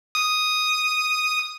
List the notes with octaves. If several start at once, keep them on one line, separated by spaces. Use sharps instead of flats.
D#6